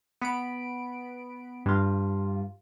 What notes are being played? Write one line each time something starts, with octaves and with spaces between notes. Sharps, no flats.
B3 B5 D7
G2 F4